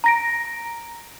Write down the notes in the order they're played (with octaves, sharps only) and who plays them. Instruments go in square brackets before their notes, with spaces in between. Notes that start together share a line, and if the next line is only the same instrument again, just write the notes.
[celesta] A#5 A#6 D7